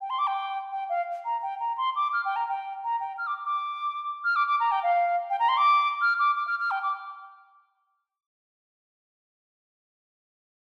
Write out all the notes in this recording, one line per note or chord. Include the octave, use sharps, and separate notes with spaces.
G5
C6
D6
G5
G5
F5
A#5
G5
A#5
C6
D6
F6
G5
A#5
G5
A#5
G5
F6
D6
D6
F6
D6
D6
A#5
G5
F5
G5
A#5
C6
D6
F6
D6
D6
F6
F6
G5
D6